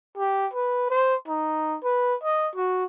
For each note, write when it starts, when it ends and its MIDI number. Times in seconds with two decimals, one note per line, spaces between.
0.18 0.47 67
0.53 0.87 71
0.90 1.15 72
1.28 1.78 63
1.84 2.15 71
2.23 2.49 75
2.55 2.84 66